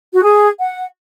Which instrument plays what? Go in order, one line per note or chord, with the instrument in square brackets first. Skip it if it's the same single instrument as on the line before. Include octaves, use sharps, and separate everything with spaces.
[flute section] F#4
G#4
F#5